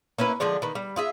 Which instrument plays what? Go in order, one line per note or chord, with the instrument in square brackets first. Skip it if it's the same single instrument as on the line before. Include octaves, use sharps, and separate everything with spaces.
[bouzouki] A#3 C#4 E4 B4
D3 F3 G#3 D4
D#3 B3
G3
F4 G#4 E5